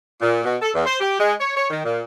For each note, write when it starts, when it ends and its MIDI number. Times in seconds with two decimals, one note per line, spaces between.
0.22 0.44 46
0.44 0.56 47
0.62 0.70 69
0.74 0.84 40
0.86 0.95 72
1.01 1.19 67
1.19 1.34 56
1.40 1.56 73
1.57 1.66 73
1.70 1.83 51
1.84 2.02 46